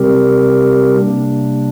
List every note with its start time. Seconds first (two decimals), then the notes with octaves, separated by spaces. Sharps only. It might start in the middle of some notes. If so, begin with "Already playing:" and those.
Already playing: C3 G3 C4 G4 A#4
0.96 C3 G3 A#3 D4